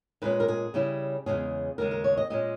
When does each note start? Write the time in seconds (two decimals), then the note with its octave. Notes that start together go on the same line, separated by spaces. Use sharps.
0.22 A#2 G#3 C#4 B4
0.40 A#4
0.48 G#4
0.74 C#3 G3 C#4 E4
1.26 E2 C#3 G#3 C#4 G#4
1.78 D#2 C#3 G#3 A#4
1.91 A#4
2.04 C#5
2.17 D#5
2.30 A#2 G#3 C#4 D#5